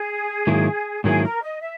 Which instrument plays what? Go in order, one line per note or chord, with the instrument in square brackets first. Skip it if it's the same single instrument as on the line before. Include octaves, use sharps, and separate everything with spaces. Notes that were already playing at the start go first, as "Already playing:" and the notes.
Already playing: [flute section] G#4
[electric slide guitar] G#2 D#3 F#3 A#3 E4
[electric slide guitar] G#2 D#3 F#3 A#3 E4 [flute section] G#4
[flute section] A#4
D#5
E5